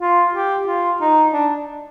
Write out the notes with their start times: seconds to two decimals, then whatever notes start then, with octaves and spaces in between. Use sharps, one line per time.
0.01 F4
0.34 G4
0.67 F4
1.01 D#4
1.33 D4